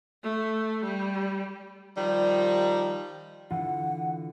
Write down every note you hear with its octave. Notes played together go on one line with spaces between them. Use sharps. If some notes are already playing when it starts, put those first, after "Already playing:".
A3
G3
D#3 F3 G3
D3 E3 F4 F#5